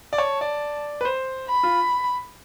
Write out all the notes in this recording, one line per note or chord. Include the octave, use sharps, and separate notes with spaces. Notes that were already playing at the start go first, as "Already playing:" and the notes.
D5
C#5 A5
D5
B4
C5
B5
F4